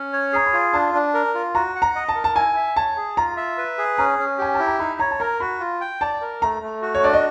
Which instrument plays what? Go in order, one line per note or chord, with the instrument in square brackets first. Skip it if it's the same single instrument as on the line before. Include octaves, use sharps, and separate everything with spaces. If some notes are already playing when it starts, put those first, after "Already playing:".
Already playing: [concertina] C#4
C#5
[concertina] G#4 [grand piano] A#5
[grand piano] B5
[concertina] F4
[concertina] D4 [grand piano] A5
[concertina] D4
A#4
F4
[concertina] F#4 [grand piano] A#5
[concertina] F#5
[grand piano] A#5
[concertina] D#5
[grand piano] A5
[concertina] A#4
[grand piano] A5
[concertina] E4 [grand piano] G#5
[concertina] E5
[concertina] C#5 [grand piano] A5
[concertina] G#4
[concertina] F4 [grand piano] A#5
[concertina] E5
B4
G#4
[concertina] C#4 [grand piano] A#5
[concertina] C#4
[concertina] G4 [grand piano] G#5
[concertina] E4 [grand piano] A5
[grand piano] A#5
[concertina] D#4 [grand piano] B5
[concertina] C#5 [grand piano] A#5
[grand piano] A5
[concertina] A#4 [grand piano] A#5
[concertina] F#4 [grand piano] B5
[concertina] F4
G5
[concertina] D5 [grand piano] A5
[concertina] A#4
[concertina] A3 [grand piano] A#5
[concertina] A3
F#4
[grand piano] C#5
[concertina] D4 [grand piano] D5
[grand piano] D#5